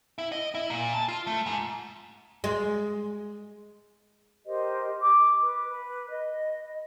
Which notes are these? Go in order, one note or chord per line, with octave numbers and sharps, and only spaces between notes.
E4
D#5
E4
A#2
A5
F4
A3
G#2
G#3
G4 A#4 C5 D#5
D6
B4
B4
D#5